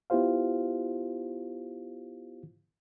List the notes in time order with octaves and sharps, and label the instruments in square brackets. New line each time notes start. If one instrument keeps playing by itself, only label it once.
[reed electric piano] B3 E4 F4 G4 C5 F5